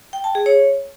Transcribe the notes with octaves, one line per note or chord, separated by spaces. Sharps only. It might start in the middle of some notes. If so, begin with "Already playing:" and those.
G5
A5
G#4
C#5